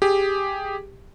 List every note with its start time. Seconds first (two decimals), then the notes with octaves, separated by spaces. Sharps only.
0.02 G4 G#4